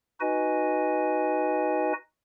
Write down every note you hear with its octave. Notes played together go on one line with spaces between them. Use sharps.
D#4 F#4 B4 D#5 G#5